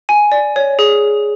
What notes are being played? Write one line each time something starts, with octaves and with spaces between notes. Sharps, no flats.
G#5
D5
C#5
G#4